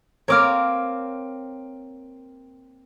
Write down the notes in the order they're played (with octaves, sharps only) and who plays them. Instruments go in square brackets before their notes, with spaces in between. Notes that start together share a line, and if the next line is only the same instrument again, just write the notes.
[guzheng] A#3 C4 A#4 [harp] C#5 D6 F6